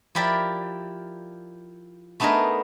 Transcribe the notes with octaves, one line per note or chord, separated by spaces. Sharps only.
F3 E4 G4 A#4 D5
A3 B3 D4 D#4 G#4 A#4